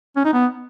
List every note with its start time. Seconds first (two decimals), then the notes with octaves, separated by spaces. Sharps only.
0.16 C#4
0.25 D#4
0.33 B3